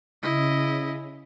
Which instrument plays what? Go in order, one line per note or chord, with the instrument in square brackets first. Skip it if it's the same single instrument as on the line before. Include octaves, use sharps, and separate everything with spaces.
[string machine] C#3 [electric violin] E4 D#5